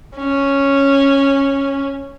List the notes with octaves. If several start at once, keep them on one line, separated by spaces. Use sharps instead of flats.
C#4